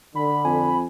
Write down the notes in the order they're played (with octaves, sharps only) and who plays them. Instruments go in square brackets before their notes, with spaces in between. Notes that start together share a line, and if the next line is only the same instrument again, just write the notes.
[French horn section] D3 [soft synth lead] B5
[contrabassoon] F2 [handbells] G#5